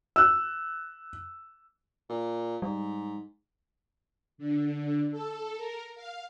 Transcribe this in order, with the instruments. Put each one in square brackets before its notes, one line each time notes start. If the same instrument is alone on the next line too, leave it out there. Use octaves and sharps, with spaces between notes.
[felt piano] E6 F#6
[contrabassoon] A#2
[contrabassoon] G#2 [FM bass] G3
[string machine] D3
A4
A#4
F5